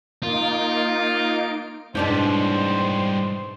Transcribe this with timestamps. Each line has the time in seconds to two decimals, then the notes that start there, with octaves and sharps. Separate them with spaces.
0.23 A#3 D#4 F4 D7
1.95 G#2 B2 E3 G3 D4 C5 G5